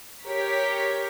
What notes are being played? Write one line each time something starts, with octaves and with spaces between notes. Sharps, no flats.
G4 A#4 C#5 B6